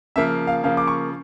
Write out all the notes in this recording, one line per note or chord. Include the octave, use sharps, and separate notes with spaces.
C#3 F3 A#3 E5
F5
C#3 F3 A#3 F5
D6
C#6